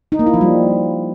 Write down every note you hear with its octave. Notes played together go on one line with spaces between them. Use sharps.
D#4
A#3
E4
F3
G3